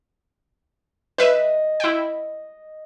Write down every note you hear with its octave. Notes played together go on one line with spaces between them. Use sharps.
B4 D#5 E5
E4 G5